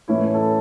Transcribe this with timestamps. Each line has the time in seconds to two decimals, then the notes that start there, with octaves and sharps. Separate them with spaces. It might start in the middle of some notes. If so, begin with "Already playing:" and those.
0.08 A2 E3 A3 C#4 E4
0.34 A4